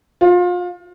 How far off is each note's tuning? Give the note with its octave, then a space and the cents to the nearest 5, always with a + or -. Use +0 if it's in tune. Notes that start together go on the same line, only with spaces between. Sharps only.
F4 +30